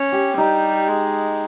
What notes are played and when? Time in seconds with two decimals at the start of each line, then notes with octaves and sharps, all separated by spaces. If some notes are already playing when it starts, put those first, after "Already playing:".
Already playing: C#4
0.12 G4
0.37 G3 D#4
0.88 G#3